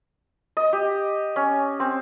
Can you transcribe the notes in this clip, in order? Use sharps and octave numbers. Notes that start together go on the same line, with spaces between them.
D#5
G4
C#4
C4